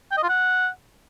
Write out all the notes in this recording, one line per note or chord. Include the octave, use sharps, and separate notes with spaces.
G5
D#5
F4
F#5